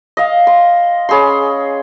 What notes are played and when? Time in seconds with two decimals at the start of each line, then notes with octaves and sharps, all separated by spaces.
0.17 D#5 F5
0.47 C6
1.09 C#4 G#4 B5 C6